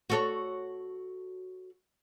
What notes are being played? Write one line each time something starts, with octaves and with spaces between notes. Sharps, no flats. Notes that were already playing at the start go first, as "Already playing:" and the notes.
F#4 A4 C#5